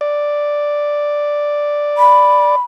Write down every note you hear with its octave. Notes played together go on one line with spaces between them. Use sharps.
D5
B5